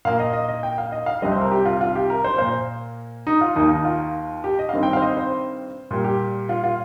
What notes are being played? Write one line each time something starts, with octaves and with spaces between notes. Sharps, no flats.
A#2 A#3 F5
D#5
D#5
D#5
G5
F5
D#5
F5
C2 C3 G3 C4 D#5
C5
A#4
G4
F4
F4
G4
A#4
C5
A#2 A#3 C5
D#4
F4
D#2 D#3 A#3 D#4
D#4
F4
G4
D#5
F5
G2 D#3 C4 D#5
G5
C5 F5
D#5
C5
A#2 G3 A#3
G4
F4
F4